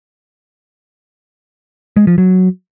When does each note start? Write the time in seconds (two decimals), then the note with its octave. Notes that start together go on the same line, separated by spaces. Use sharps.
1.97 G#3
2.07 F3
2.18 F#3